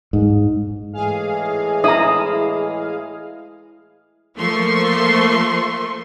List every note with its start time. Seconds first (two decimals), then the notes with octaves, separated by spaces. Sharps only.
0.13 G#2
0.93 A2 E3 G#3 G#4 F5
1.84 E4 A#5 D#6
4.37 F3 A3 A#3 C6 C#6